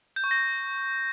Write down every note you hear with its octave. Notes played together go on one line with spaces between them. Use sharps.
G6
C#6
A#6